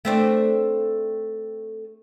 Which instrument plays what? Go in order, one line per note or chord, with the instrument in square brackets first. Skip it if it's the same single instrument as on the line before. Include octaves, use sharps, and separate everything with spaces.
[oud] A3 C4 D4